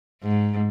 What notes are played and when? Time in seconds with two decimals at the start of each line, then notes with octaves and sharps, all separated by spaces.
0.23 G#2